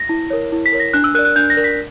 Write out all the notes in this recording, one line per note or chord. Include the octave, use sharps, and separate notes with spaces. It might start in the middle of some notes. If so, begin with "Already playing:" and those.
Already playing: A#6
E4
A#4 C#5
E4
B6
A#4 C#5
A#6
D4 F#6
E6
A#4 D5 F#6
F#6
D4 G6
A#6
A#4 D5
B6